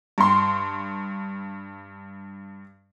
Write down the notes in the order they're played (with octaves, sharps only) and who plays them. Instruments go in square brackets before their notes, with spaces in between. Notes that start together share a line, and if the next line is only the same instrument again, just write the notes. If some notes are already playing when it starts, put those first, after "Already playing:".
[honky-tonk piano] G2 C6